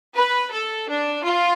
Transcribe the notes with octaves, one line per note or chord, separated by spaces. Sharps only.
B4
A4
D4
F4